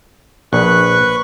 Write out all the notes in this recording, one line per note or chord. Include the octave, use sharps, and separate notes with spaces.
A#1 B4 C#6 F#6